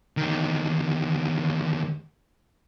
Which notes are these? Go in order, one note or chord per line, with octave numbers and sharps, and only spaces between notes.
E2 D#3